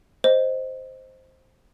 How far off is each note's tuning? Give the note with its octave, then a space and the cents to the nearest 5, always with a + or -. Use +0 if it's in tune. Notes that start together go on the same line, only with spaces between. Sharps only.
C5 +0 D#5 +0